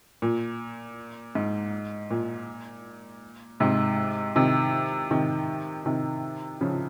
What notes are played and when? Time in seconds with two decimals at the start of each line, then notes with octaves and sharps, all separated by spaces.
0.22 A#2
1.35 G#2
2.11 A#2
3.60 G#2 C3
4.36 C3 D#3
5.11 C3 D#3
5.86 C3 D#3
6.61 C#3 F3